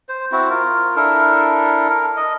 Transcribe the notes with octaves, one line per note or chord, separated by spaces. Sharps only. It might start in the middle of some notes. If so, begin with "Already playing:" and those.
C5
C4 E4 F#4
F4 A#4
D4 E4 A4 A#4
A#4
D#5